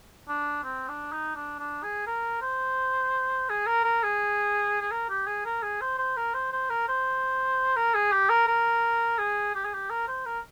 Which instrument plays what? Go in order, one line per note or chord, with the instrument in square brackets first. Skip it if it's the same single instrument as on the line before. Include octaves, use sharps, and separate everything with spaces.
[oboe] D4
C4
D4
D#4
D4
D4
G#4
A#4
C5
G#4
A#4
A#4
G#4
G#4
A#4
G4
G#4
A#4
G#4
C5
C5
A#4
C5
C5
A#4
C5
A#4
G#4
G4
A#4
A#4
G#4
G4
G#4
G4
A#4
C5
A#4